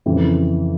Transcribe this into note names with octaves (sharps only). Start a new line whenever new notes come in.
F2 C#3 E3